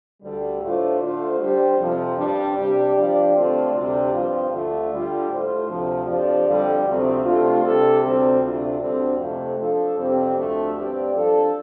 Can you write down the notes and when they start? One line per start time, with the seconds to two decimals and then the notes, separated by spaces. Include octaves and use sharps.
0.22 D2 D3 G3
0.61 A2 A3 D4 F4 C5
1.00 D3 A3 F4 C5
1.39 G3 D4 G4 C5
1.78 F2 C3 F3
2.17 G2 G3 D4
2.56 C3 G3 D4 G4
2.96 F3 D4 G4 D5
3.34 D3 A3 C4 F4 D5
3.73 D2 C3 G3 D4 G4
4.12 G2 F3 C4 F4
4.50 D2 D3 A3 D4 F4
4.90 D3 G3 F4
5.29 A2 A3 F4 C5
5.68 D2 C3 F3
6.06 F2 F3 D4 G4 D5
6.46 F2 D3 G3
6.85 D2 C3 F3 A3 C4
7.23 C3 A3 D4 F4
7.62 C3 G3 D4 A4
8.02 D2 C3 G3 C4
8.40 D2 C3 A3 D4 F4
8.79 D2 D3 G3 C4
9.18 F2 C3 A3
9.57 F3 D4 A4
9.96 F2 C3 G3 C4 G4
10.35 D2 D3 F3 A3
10.74 G2 G3 C4 G4 D5
11.13 F3 D4 A4